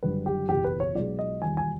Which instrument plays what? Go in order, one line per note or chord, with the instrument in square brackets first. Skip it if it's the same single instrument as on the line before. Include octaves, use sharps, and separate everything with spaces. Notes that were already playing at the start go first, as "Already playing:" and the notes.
[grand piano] F#1 F#2 D3 G3 B4
G4
F#1 E2 B2 G4
B4
C#5
B1 B2 G#3 D5
D#5
E1 D#2 D#3 G3 G#5
G#5